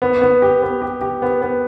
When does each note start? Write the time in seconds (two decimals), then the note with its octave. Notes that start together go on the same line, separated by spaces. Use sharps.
0.02 B3
0.22 B3
0.42 G4
0.62 B3
0.82 G4
1.01 G4
1.22 B3
1.42 B3